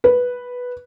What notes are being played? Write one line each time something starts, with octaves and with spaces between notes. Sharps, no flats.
B4